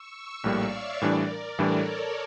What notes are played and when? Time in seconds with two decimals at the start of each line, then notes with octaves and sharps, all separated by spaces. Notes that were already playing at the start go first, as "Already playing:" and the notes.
Already playing: C#6 E6
0.44 A#1 A2 G3 A#3 D5 F5
0.72 C#5 E5
1.01 A2 E3 G3 D4 A#4 D5
1.58 A2 E3 G3 D4 A4 C#5
1.87 A#4